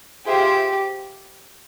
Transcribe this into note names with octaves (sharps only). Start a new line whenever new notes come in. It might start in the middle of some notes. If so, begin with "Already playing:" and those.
F4 G4 G#4 C5 E5 G5